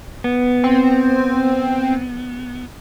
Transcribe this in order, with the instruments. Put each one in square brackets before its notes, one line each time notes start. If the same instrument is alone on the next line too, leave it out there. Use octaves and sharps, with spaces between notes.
[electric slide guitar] B3
[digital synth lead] C4